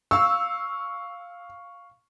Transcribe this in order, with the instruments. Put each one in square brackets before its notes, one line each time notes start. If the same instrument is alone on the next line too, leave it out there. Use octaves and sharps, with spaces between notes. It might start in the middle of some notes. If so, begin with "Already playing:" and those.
[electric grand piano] F5 C#6 [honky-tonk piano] E6